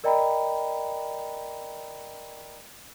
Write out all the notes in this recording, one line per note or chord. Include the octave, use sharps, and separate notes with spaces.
A#4 D5 D#5 G5 A#5 B5